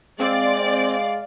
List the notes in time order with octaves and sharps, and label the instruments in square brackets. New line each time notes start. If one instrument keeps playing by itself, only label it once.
[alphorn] G#3 [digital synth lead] C4 [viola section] D5 [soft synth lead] F5